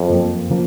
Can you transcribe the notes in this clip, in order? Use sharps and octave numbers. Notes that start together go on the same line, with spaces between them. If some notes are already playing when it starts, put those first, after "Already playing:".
Already playing: F2
F#2 F3 A#3
C#3 F3 A#3